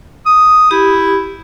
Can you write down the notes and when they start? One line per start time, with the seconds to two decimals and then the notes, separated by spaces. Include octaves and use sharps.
0.26 D#6
0.71 E4 G4